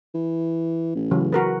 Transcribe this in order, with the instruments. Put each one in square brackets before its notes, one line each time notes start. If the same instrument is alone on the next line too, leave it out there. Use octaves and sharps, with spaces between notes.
[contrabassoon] E3
A1
[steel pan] C#3 E3 F#3
F#4 A#4 B4